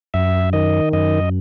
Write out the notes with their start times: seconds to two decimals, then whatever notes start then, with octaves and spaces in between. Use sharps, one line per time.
0.14 F#2 E5
0.53 D#3 D#5
0.93 F#2 D#5